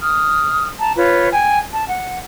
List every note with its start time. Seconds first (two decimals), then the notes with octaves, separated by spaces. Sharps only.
0.01 D#6 F6
0.79 A5 A#5
0.96 F4 B4 C#5
1.32 G5 G#5
1.72 A5
1.88 F#5